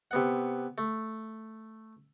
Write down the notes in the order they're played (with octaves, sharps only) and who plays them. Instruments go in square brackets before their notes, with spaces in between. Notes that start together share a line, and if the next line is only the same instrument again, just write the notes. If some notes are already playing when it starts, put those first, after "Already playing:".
[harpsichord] C3 B3 F#5
A3